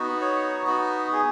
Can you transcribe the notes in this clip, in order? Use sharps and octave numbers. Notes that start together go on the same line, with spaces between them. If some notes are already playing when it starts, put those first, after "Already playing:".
Already playing: B3 D#4 F#4
C#5
F#4
G#4